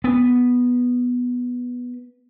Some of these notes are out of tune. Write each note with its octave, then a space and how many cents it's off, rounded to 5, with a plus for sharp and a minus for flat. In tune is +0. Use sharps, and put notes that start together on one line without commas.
B3 -5